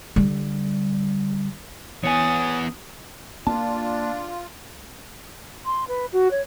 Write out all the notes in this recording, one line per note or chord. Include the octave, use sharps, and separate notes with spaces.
D3 G3
E3 B3 C#5 G#5 D#6 A6
A#3 D4 F4 A5
C6
B4
F#4
C#5